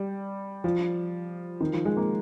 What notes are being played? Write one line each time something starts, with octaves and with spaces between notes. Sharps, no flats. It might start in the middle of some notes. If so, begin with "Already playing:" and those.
Already playing: G3
F3
D#3
F3
G#3
A#3